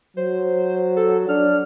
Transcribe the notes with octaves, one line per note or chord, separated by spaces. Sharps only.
F#3 C5
A4
D4 F6